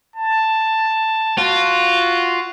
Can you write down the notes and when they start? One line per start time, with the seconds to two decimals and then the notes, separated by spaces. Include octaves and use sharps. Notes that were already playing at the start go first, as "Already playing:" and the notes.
0.16 A5
1.38 F4 F#4